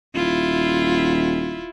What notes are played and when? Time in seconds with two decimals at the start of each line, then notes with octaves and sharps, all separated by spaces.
0.15 D#1 E4 F4